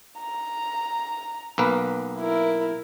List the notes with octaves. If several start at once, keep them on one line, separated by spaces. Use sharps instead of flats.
A#5
B1 A#3 B4
E4 A#4